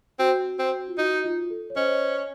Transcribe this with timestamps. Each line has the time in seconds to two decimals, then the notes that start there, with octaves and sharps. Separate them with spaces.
0.19 C4 F#4
0.59 C4
0.88 F4
0.97 D#4 F#4
1.24 F4
1.50 A4
1.70 C#5
1.76 C#4 C5 D#5
2.15 C#5